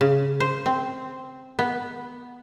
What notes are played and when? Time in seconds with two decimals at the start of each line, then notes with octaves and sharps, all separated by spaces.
0.01 C#3
0.40 C5
0.66 C4
1.59 B3